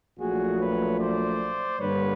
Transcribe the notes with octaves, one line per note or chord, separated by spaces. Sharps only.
A#1 A#2 F#3 A3 F#4 G#4
B4 C#5
C5 D5
G2 D3 G3 A#3 B4 C#5